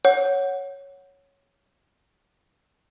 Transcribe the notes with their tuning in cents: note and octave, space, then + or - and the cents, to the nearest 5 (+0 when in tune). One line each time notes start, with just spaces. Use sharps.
C#5 +0 F#5 +0